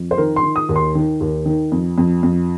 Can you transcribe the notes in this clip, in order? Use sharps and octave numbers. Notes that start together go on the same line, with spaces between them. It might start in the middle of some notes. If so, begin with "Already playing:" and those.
Already playing: F2
C5
D#3 A#4
C6
D#3
D#6
D#2
C6
D#3
D#2
D#3
F2
F2
F2